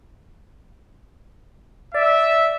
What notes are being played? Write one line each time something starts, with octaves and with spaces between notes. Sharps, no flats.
D5 E5